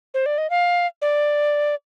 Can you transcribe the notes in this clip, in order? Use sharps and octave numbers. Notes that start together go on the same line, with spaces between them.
C5
D5
D#5
F5
D5